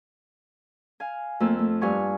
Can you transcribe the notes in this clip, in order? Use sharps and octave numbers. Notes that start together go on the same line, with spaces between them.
F5 G#5
F2 A3 A#3 F4 E6
A3
G2 F5 G#5 C#6